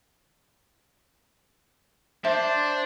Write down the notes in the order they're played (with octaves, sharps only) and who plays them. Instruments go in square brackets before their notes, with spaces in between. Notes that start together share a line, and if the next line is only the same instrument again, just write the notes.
[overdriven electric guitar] D4 [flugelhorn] C5 [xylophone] E5